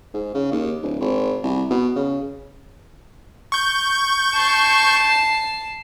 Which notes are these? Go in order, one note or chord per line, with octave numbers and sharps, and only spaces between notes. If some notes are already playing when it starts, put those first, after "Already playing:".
G#2
C#3
D#2
D1
G#1
C2
B2
C#3
C#6 G6
A5 C7